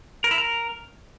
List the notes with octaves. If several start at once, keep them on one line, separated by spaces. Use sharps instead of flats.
A#4
E4
A#4